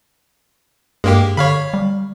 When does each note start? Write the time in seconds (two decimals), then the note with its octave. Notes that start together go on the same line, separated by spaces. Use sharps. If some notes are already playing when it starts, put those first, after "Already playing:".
1.04 G2 G#3 A#3 G4
1.37 D3 C#5 F5 B5
1.74 G3